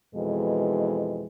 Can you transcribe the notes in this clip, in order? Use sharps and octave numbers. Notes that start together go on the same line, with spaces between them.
F2 B2 E3 G#3